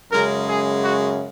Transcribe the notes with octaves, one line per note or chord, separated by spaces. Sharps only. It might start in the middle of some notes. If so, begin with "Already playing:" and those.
F#2 C#3 G#3 A#4
G#4
F#4